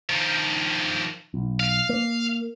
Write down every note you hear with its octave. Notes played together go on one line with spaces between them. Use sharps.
D#3 F3
B1
F5
A#3